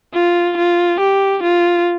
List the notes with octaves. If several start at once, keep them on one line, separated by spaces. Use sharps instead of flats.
F4
F4
G4
F4